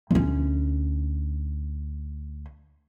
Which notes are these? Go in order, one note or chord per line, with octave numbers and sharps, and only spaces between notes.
D2 C#4